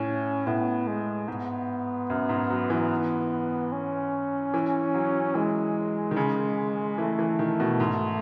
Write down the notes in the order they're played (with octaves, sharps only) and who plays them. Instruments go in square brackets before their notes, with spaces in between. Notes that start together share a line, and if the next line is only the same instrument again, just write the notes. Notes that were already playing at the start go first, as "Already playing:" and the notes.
Already playing: [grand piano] A2 [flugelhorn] C#4
[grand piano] A2 [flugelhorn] B3
[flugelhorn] G#3
[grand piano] G#2 [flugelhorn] B3
[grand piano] F#2
G#2
F#3
E3
[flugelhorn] C#4
[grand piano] E3
F#3
[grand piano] E3 [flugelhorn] G#3
[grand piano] D#3
C#3
[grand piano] E3 [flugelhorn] A3
[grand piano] E3
D#3
B2
G#2